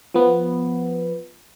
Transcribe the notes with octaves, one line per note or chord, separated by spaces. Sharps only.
F3 B3